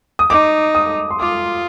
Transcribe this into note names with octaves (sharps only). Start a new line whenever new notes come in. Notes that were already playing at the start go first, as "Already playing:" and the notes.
D#6
D#4 D6
D#6
C6
F4 D6